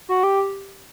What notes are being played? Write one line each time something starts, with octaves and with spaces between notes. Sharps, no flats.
F#4
G4